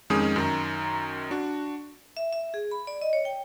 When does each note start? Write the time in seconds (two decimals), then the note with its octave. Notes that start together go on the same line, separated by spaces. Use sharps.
0.10 F2 D#3 G#3 C#4 G#4 D#6
0.36 F#2 D#3 A#5
1.31 D4 F#4
2.17 E5
2.33 E5
2.54 G#4
2.71 B5
2.87 D5
3.01 D#5
3.13 C#5
3.25 G5